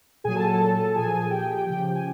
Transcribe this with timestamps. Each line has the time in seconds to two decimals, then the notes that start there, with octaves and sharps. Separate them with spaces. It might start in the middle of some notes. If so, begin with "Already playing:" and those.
0.24 A#2 F#3 G#4 G#5
0.36 A4 A5
0.48 A4 A5
0.88 A5
0.95 A#2 F3 G#4 G#5
1.30 G4 G5
1.48 G4 G5
1.66 C#3 F3 G4 G5
1.95 G#5